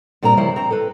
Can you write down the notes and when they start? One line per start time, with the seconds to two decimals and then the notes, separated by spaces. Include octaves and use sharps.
0.23 A#2 G3 C4 A#4 A#5
0.37 C#3 F3 G3 E4 C5
0.56 C4 F#4 A#5
0.70 A4 B4